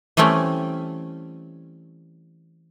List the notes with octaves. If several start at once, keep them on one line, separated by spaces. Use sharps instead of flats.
E3 G3 A3 C4 C#4